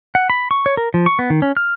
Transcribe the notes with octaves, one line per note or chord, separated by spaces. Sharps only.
F#5
B5
C#6
C#5
A#4
F3
C#6
B3
D#3
C#4
F6